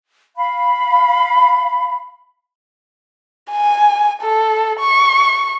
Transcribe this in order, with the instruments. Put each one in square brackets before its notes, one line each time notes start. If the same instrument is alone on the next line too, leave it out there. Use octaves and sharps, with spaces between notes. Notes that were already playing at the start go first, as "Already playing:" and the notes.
[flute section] F5 B5
[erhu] G#5
A4
C#6